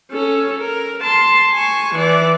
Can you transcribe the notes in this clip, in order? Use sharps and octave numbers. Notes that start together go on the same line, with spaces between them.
C#4 A4
A#4
A5 C6
G#5 C#6
E3 D5